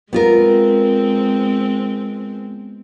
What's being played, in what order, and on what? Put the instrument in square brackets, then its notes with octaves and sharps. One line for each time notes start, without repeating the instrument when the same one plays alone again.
[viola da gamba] G#3 C4 [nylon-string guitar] B3 F4 A#4